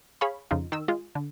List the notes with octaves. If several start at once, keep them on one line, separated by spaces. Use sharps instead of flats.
G#4 C#5 F5 B5
F2 C#3 D#4 F4
D#3 E6
G#3 F4
D3